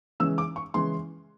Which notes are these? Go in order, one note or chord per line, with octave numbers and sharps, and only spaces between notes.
C#3 E3 G#3 C#4 E6
D6
C#6
C#3 E3 G#3 C#4 C6